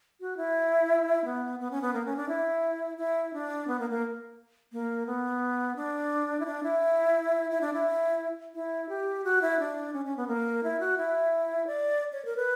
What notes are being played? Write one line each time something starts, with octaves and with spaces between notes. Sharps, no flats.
F#4
E4
B3
B3
C#4
B3
A#3
C#4
D4
E4
E4
D4
B3
A#3
A#3
A#3
B3
D4
E4
D4
E4
E4
D4
E4
E4
G4
F#4
E4
D4
C#4
C#4
B3
A#3
E4
F#4
E4
D5
C#5
A#4
B4